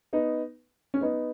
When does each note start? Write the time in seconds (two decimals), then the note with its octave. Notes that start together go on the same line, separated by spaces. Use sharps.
0.13 B3 D#4
0.94 C#4
1.01 B3 D#4